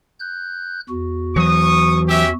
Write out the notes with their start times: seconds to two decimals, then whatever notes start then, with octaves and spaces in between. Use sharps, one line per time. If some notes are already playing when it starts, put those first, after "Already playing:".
0.20 F#6 G6
0.89 E2 F#4
1.36 E3 F#3 C#6 D#6
2.09 C#4 G4 E5